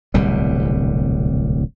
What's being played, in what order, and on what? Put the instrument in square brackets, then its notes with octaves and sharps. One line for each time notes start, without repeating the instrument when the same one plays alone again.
[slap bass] D1 C2 B2 G3